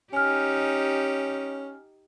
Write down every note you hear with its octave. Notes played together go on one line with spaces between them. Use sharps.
C#4 D#4 G4 G#5 F6